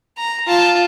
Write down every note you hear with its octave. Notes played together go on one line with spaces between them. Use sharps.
A#5
F4 A5